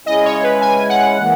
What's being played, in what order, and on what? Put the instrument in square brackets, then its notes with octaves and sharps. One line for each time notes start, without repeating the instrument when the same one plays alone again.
[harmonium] C#3 G#3 C#4 E4 [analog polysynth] D#5
[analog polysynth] C#5
B4
G#5
F#5
[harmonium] E3 A#3